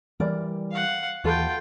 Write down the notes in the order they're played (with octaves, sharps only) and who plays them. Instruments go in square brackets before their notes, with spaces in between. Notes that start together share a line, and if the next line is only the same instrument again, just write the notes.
[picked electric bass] E3 G3 [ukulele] A#4 D5
[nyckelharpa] F5 F#5
[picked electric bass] D#2 E3 [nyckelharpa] F4 G5 [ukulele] F#4 A4